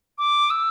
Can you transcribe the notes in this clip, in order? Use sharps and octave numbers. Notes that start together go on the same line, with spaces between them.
D6
E6